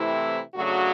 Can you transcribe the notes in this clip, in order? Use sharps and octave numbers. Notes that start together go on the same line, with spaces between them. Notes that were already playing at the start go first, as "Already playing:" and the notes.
Already playing: C3 E3 A3 C4 E4
C#3 F#3 A3 D4 F#4